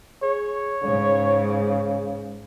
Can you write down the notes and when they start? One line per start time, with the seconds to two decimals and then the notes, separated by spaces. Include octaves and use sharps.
0.23 G#4 C#5
0.84 G#2 C#3